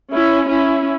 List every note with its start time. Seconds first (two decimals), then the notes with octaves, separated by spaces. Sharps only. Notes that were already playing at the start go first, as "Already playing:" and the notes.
0.12 C#4 E4
0.48 C#4 E4